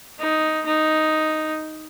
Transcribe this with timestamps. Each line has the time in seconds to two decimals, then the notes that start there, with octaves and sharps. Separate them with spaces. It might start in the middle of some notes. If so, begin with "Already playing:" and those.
0.19 D#4
0.66 D#4